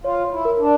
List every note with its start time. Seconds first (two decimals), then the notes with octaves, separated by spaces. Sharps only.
0.04 F4 C#5
0.25 C#5
0.31 E4
0.45 A#4
0.59 D4